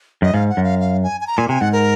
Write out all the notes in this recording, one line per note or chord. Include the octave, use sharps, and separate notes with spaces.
F#2 D#5
G#2 F5
F#5
F#2
F5
F5
G#5
G#5
A#5
A#2 G#5
C3 G#5
G#2 F#5
A#4